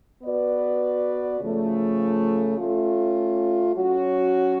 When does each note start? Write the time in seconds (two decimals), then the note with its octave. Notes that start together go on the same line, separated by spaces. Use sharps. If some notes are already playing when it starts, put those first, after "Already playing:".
0.22 B3 F#4 B4 D5
1.41 C#3 F3 A3
2.58 A3 C#4 F4
3.76 F#3 C#4 F#4